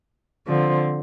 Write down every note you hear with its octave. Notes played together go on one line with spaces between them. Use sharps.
D3 F3 C4